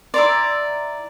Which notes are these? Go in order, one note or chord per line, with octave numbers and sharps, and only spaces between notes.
E4 D5 A#5 C6